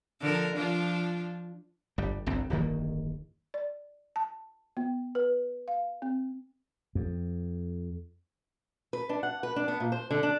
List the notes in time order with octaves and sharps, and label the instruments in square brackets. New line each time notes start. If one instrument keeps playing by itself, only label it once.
[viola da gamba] D3 F3 A#4
F3 D4 F4
[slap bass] G1 G3
G1 C2 C4
D1 G1 D#3 A#3
[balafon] D5
A5
B3
B4
F5
C4
[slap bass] F2
[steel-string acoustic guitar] B4
D4
F#5
B4
D4
B3
A#2
C5
D3
D4